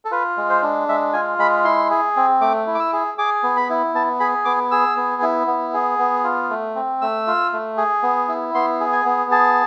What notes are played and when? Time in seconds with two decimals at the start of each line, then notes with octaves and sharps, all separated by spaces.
0.05 A4
0.11 F4 B4
0.37 G#3
0.50 C5
0.63 D4
0.88 G#3 E5
1.13 F4 G#5
1.39 G#3 B5
1.64 E4 C6
1.90 G#4
2.16 C4
2.41 A3 D6
2.67 E4
2.75 D6
2.80 E6
2.93 G#4
3.18 G#4 D6
3.43 B3
3.57 B5
3.70 E4
3.95 B3 A5
4.20 G#4 B5
4.45 B3 D6
4.71 G#4 E6
4.97 B3
5.22 E4
5.47 B3
5.74 G#4
5.99 B3
6.24 F4
6.50 A3
6.76 C4
7.01 A3 E6
7.27 F4
7.53 A3
7.77 G#4
8.03 B3
8.28 E4
8.54 B3 C6
8.80 G#4
8.93 G#5
9.06 B3
9.31 G#4 A5